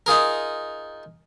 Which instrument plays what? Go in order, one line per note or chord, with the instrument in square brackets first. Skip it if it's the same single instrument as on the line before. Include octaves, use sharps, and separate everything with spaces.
[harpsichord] D#4 F4 G#4 A#4